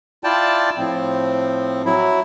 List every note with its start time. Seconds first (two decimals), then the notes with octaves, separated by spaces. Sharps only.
0.24 E4 F4 D5 G5 A5
0.78 A2 F3 C4
1.85 F#3 E4